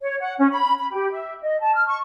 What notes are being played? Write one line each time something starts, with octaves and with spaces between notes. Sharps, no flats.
C#5
F#5
C#4
B5
B5
G4
E5
D#5
A5
F6
C#6